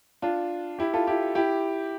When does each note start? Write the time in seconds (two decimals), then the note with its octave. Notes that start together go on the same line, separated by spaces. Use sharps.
0.22 D4 F4
0.79 E4 G4
0.93 F4 A4
1.07 E4 G4
1.35 E4 G4